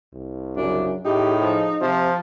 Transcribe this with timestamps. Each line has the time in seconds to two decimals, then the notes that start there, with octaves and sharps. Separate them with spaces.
0.13 C2
0.56 F#2 C#3 D4
1.05 A2 D#4 G4 G#4
1.41 F3
1.81 C3 F3